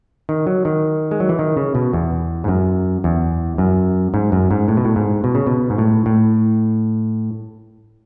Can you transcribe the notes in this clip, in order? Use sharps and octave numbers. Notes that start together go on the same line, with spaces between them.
D#3
F#3
D#3
G#3
F#3
E3
D#3
C#3
B2
E2
G#2
F#2
E2
F#2
G#2
F#2
G#2
A2
B2
A2
G#2
B2
C#3
B2
G#2
A2
A2